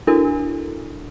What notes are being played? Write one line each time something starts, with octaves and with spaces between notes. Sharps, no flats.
D4 E4 F#4 A4 A#4